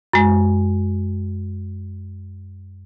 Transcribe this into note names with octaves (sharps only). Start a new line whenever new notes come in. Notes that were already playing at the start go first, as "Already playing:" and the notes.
F#2 G#3